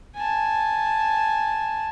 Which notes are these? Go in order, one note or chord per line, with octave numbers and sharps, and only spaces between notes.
G#5 A5